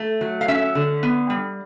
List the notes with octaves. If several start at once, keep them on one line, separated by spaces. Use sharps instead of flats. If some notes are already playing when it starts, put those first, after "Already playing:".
Already playing: A3
F#3
F5
C#4 E5
D3
B3
G3